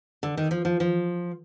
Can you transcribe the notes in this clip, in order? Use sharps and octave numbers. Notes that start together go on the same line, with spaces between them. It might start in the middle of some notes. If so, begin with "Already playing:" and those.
D3
D#3
F3
F3
F3